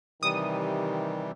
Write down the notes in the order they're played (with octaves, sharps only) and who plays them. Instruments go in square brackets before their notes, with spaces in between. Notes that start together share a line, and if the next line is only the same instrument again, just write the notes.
[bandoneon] C3 E3 G3 [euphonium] D#3 [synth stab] D#6